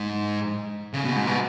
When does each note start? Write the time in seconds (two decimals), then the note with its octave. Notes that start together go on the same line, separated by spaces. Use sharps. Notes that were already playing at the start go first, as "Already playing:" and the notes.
Already playing: G#2
0.94 C#3
1.05 B2
1.16 G#2
1.27 B2